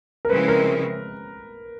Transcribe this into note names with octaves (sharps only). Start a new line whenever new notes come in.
A#4
C#3 F3 G#3 C4 E4 B4
A#4